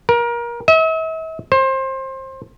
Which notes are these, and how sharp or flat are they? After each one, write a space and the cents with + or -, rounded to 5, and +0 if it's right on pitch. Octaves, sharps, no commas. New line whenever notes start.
A#4 +25
E5 -45
C5 +25